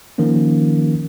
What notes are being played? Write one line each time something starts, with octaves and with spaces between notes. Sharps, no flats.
D#3 F3 A#3 C#4